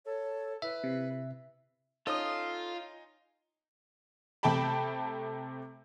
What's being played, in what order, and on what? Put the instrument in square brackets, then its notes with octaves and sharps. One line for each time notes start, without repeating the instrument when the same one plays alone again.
[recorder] A4 [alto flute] C#5
[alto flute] E4 [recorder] B4 [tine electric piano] E5
[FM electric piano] C3
[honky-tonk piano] C#4 D#4 [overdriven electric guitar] F4 [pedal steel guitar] A4 D#6
[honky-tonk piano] C3 A3 G5 A5 B5